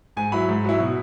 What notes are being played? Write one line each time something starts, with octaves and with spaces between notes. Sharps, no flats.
G#2 G#5
F#3 E4 B5
G#2
F#3 E4
B2